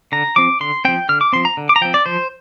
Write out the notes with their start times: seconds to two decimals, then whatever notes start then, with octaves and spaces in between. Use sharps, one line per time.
0.12 D3 A#5
0.36 F3 C4 D6
0.61 D3 C6
0.85 F3 C4 G5
1.09 D3 F6
1.21 D6
1.33 F3 C4 C6
1.45 A#5
1.57 D3
1.69 D6
1.76 A#5
1.81 F3 C4 G5
1.94 D5
2.06 F3 C5